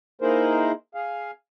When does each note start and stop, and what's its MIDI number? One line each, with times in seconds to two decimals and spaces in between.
0.22 0.72 58
0.22 0.72 63
0.22 0.72 64
0.22 0.72 68
0.22 0.72 70
0.22 0.72 72
0.95 1.31 68
0.95 1.31 77